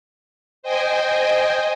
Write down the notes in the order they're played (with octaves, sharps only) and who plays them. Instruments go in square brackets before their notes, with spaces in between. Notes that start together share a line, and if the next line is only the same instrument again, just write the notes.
[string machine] C5 D#5 G5 G#5